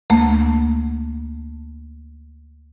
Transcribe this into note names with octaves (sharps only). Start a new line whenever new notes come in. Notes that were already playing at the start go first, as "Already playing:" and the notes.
D2 A3 A#3